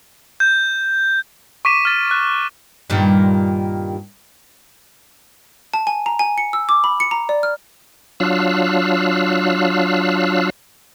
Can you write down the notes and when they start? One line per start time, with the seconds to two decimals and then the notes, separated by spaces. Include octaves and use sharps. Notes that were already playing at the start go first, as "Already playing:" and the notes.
0.40 G6
1.65 C#6 D6 B6 D#7 E7
1.85 F6 A6
2.11 F#6
2.90 G2 A#2 D#3
5.74 A5
5.87 G#5
6.06 A#5
6.19 G#5
6.38 C#7
6.53 E6
6.69 D6
6.84 B5
7.00 C#7
7.11 A#5
7.29 D5
7.43 F6
8.20 F#3 D4 F4 F5 E6 F#6